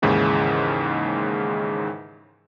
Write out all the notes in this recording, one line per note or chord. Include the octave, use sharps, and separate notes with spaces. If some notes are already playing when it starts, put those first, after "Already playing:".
D#2 G#2 C#3 E3